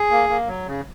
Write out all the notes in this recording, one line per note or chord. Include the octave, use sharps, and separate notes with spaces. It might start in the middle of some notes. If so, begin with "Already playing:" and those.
Already playing: G#4
A#3
A#3
F#3
C#3